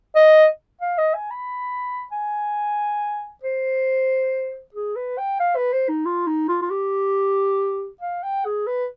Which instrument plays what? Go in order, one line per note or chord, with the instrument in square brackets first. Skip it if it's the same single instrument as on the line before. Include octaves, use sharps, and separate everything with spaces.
[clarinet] D#5
F5
D#5
G#5
B5
G#5
C5
G#4
B4
G5
F5
B4
C5
D#4
F4
D#4
F4
F4
G4
F5
G5
G#4
B4